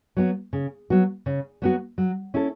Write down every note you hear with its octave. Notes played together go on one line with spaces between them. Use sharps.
F#3 B3 F#4
C#3
F#3 B3 F#4
C#3
F#3 B3 F#4
F#3
C#4 E4 A4